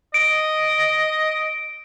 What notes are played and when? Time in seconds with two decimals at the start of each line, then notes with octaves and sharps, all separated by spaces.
0.14 D#5 D7